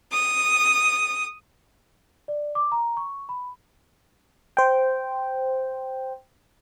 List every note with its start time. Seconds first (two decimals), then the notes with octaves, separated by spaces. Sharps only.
0.13 D#6
2.28 D5
2.55 D6
2.72 A#5
2.97 C#6
3.29 B5
4.57 C5 G5